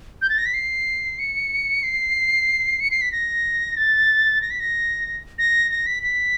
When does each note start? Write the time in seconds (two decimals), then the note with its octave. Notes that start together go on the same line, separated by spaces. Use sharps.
0.22 G6
0.30 A6
0.38 A#6
0.46 B6
0.54 C7
1.19 C#7
1.83 C7
2.80 C#7
2.91 C7
3.01 B6
3.12 A#6
3.77 A6
4.42 A#6
4.51 B6
4.60 A#6
5.39 A#6
5.71 A#6
5.87 B6
6.03 B6